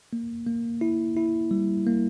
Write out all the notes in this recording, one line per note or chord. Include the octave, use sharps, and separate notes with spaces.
A#3
A#3
E4
E4
G3
A#3